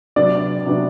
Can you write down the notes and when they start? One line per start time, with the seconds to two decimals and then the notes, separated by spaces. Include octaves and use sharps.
0.16 C3 F#3 B3 D4 D5
0.66 C3 F#3 B3 D4